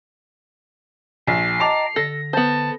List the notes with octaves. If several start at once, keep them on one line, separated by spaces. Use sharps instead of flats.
A#1 C7
D#5 G5 A5 A#5 D6 F7
D3 A4 A#6
B3 C5 A5